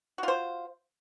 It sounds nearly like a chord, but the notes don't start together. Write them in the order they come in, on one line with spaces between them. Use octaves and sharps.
F#4 F4 C5